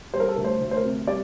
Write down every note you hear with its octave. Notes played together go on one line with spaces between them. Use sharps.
G3 C5
A#4
A4
D2 A#4
C5
D2
C5
A#4
C3
G3 D5